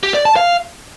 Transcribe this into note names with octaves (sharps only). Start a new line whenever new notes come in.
G4
D5
A5
F5